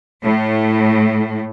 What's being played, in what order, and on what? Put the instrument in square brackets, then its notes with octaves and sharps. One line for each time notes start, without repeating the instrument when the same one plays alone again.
[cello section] A2